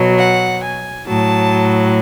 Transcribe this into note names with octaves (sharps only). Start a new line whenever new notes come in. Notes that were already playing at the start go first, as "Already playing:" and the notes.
Already playing: B2 F#3
F#5
G#5
A2 F#3 A5